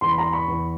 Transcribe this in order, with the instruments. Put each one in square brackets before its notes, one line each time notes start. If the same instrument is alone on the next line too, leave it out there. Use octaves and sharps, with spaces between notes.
[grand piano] E2 C6
B5
A#5 C6
B5 C#6
E2